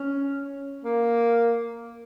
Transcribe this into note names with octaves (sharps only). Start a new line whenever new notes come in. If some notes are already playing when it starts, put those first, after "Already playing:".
Already playing: C#4
A#3